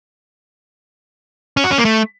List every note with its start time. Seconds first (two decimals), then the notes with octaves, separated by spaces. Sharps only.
1.57 C#4
1.64 F#4
1.71 C#4
1.78 A#3
1.85 A3